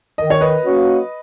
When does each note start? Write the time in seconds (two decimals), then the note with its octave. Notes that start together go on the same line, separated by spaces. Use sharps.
0.18 D#3 D#5
0.30 C#5
0.41 B4 D#5
0.63 F#3 A#3 C#4 F#4